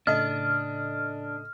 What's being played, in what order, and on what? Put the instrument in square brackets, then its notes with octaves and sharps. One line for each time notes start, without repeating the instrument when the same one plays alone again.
[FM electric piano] A2 C#3 A4 [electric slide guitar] D4 [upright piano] D#5 [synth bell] F6